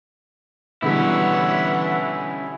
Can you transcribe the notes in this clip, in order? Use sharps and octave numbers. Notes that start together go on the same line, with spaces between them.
B2 D3 E3 G3 C#4 E4 E5 F#5